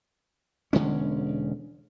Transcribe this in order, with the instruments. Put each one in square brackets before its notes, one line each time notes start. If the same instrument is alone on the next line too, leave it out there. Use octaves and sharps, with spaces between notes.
[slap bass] E1 D3 G#3 C#4